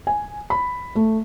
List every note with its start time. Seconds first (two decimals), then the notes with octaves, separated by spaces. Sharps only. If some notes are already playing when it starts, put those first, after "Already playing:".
0.07 G#5
0.50 B5
0.95 A3